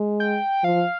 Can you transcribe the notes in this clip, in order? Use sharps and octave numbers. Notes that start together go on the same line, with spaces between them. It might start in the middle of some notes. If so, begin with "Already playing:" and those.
Already playing: G#3
G5
F3 F5